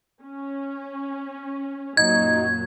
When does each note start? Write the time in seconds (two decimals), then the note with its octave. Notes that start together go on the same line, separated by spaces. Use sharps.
0.22 C#4
1.97 F#2 A#2 F#3 D#4 G#6